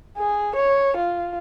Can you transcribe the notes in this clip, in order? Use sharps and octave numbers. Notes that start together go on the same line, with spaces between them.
G#4
C#5
F4